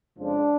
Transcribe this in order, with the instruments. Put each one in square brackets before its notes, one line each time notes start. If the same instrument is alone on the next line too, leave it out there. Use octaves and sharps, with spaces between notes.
[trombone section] F2 C#3 F3 G#3 D4